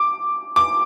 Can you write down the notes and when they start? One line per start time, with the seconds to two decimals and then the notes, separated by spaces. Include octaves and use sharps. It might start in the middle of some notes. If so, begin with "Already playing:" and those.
Already playing: D6
0.56 D6